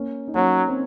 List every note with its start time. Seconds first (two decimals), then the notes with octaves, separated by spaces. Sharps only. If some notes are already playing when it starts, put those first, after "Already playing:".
Already playing: A#3 C#4
0.28 D#4
0.35 F#3 A#3 C#4
0.68 C4